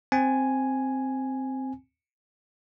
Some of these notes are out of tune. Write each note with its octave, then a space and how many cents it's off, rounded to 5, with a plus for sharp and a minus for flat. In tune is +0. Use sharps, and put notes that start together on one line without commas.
C4 +0 G#5 +0